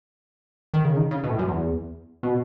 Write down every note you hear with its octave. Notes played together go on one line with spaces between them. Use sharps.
D#3
C#3
D#3
C#3
B2
A2
F#2
E2
B2